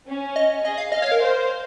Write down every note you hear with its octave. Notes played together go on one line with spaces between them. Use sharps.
C#4
D#5
G#4 D#5
F5
D#5 F5
C#5
A#4
C5